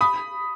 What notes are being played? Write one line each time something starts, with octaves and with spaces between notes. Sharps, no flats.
B5 D#6